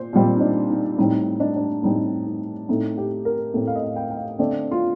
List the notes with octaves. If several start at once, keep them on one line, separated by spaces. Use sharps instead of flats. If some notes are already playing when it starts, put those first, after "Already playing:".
Already playing: A#2 C5
A#2 G3 C4
D#4
D4
D#4
A2 G3 C4 D#4
D4
D4
A2 G3 C4 D#4
D#4
A2 A3 C4 D#4
G4
A#4
A2 A3 C4 A4
F5
D#5
G5
G5
F5
D3 A3 C4 D5
F4